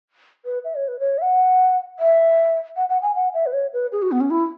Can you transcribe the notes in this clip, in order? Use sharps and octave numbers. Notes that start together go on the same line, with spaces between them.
B4
E5
C#5
B4
C#5
E5
F#5
E5
F#5
F#5
G#5
F#5
E5
B4
C#5
B4
G#4
F#4
B3
C#4
E4